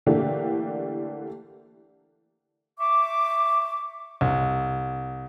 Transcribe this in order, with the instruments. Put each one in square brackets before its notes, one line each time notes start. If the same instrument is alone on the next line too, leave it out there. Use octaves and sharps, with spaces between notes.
[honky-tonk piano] D3 E3 A3 A#3 D4 G4
[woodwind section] E5 C#6 D6
[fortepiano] C2